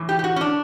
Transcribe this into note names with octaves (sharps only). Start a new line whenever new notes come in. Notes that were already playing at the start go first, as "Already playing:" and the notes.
Already playing: A2 E3
G4
G4
F#4
C#4
D4